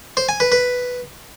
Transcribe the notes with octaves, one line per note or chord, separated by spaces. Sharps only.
C5
G#5
B4
B4